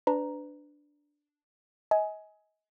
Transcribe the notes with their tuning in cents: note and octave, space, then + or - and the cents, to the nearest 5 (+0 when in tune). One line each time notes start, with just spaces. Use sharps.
D4 +0 B4 +25 A#5 +0
D#5 +35 G#5 +10